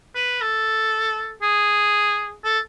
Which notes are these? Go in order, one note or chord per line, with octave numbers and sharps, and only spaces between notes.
B4
A4
G#4
A4